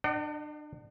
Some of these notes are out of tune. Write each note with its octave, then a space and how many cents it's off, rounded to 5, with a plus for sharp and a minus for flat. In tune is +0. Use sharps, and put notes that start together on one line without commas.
D4 +35 D#5 -25 F#5 +40